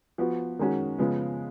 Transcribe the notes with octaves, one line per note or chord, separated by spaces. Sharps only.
F3 B3 F#4
D#3 G#3 C#4 F#4
C#3 F3 G#3 B3